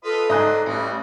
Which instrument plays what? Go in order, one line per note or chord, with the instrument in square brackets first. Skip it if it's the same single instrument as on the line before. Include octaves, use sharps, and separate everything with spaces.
[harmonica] F4 B4 D#5 [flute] A4
[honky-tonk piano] G#2 A#5 F#6 [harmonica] D5 C6 [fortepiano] D#5 G#5
[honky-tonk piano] A1 [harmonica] G3